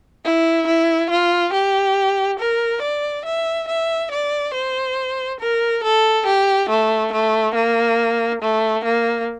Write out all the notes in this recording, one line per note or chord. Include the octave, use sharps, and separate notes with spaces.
E4
E4
F4
G4
A#4
D5
E5
E5
D5
C5
A#4
A4
G4
A3
A3
A#3
A3
A#3